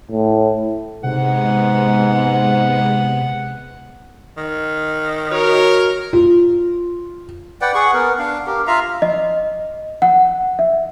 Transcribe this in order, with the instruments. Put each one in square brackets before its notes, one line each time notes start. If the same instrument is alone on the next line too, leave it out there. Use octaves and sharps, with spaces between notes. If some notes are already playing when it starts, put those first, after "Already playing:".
[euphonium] A2
[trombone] G#2 [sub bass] C3 [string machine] G#3 B3 [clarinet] F#5
[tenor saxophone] D#3
[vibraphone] F#4 [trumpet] A#4 [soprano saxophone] C#5
[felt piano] F4
[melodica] B4 D5 F#5 G5
G#4 F#5 C#6
B3 A#4
D4 F5
G4 A#4
F4 E5 F5 A#5
[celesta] D#5
F#5
E5